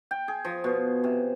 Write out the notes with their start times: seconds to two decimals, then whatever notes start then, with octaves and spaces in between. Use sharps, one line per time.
0.11 G5
0.28 G#4
0.45 F3
0.64 B2
1.04 C3